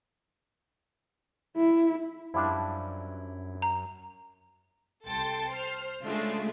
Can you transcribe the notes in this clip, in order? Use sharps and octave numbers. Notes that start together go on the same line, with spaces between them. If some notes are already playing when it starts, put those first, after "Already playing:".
E4
F#2 F3 G3 D4 E4
A#5
C2 A4 G5 A5 C6 A6
C5 F6
C#3 G#3 A3 D4 F4